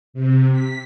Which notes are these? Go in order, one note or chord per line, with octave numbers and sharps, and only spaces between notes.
C3
B6